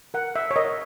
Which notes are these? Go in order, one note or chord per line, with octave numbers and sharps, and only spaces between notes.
A#4 F#5
E5
C#5
A#4 D#5